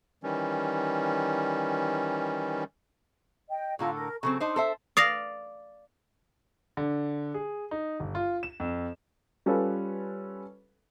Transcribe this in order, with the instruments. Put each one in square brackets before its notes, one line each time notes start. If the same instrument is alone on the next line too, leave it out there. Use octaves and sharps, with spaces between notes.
[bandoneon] D#3 E3 G3 C#4
[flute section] D#5 G5
[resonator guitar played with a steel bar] A2 D3 A4 [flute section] F4 A#5
[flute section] A#4
[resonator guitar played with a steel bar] C#3 F#3 C4 [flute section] A4 C#6
[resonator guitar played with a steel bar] D4 D#4 C5 [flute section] C6
[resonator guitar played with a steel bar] A4 C5 E5
[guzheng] D5 F5 [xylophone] D#6 A#6
[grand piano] D3
G#4
D#4
G1
F4
E7
F2
[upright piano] G3 C#4 F4 A4 B4